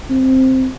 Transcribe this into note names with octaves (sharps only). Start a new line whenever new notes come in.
C4